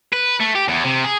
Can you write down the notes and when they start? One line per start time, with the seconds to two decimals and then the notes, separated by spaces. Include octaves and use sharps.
0.13 B4
0.40 A3
0.55 G4
0.68 E2
0.84 C3
1.04 G#4